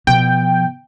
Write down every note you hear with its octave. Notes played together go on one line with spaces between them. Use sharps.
B2 F3 G5